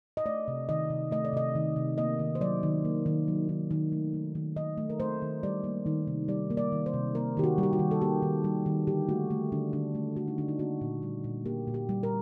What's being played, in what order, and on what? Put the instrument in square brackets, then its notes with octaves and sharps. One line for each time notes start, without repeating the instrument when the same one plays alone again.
[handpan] D#5
A3 D5
C3
D#3 D#5
C3
A3 D#5
D5
C3 D#5
D#3
C3
A#3 D#5
D#3
C5
F#3 D5
D#3
A#3
D#3
F#3
D#3
D#3
A3
A3
D#3
D#3 D#5
A3
A#4
A3 C5
D#3
G3 D5
A#3
D#3
C3
G3 D5
A#3
D5
D#3
C5
C3
A#3 A#4
D#3 G4
F#4
G3
G4
F#4
D#3
A4
A#3 G4
D#3
G3
D#3
D3 G4
A3 F#4
A3
D3 D4
D3 D4
A3
A3 F#4
D#4
D3 D4
D#4
A#3 F#4
A#2
G3
A#2
A#3 G4
A#2
G4
G3
A#4